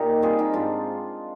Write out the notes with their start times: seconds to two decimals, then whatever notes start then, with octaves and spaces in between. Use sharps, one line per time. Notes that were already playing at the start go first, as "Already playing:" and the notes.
Already playing: A#2 D#4 G4
0.22 G3 C4 F4 G#4
0.39 D#4 G4
0.53 G#2 D4 F4